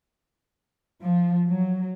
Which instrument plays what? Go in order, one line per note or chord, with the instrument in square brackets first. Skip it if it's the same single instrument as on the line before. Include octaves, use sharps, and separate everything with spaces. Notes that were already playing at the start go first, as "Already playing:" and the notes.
[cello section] F3
F#3